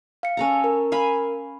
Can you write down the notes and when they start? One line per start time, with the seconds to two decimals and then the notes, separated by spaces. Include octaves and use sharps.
0.23 F5 C#7
0.37 C#4 A4 A#5
0.64 A#4
0.92 F5 G#5 B5